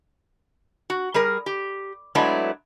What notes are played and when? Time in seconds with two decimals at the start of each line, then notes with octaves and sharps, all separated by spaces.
0.90 F#4
1.14 G3 G#4 A#4
1.46 G4
2.15 F#3 G#3 A3 B3 D4 E4